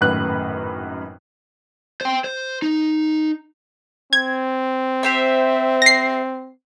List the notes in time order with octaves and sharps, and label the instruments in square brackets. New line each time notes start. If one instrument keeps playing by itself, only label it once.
[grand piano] G#1 F#2 A2 B4 F#6
[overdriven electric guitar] C5 G5
C5
D#4
[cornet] C4 [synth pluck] G#6
[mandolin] G4 C5 E5
[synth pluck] A#6 C7